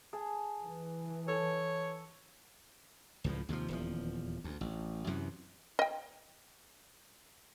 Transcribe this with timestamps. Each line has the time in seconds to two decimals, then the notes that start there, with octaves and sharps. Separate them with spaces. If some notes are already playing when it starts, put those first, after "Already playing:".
0.13 G#4 A5
0.63 E3
1.28 A4 C#5
3.24 C#2 A2 F3
3.49 D#2 C3 E3 F3
3.68 D#1 E2 F3
4.44 D2
4.61 A1
5.07 F#2 C3 E3
5.79 D#5 G5